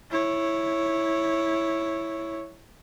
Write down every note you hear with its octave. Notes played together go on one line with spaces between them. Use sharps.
E4 C#5